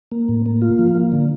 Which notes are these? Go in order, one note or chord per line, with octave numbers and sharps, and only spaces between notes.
A#3
A2
A#3
F4
F3
A#3
D3